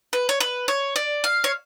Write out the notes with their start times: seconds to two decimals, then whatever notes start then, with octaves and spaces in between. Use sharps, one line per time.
0.13 B4
0.29 C#5
0.40 B4
0.68 C#5
0.96 D5
1.24 F5
1.44 C#5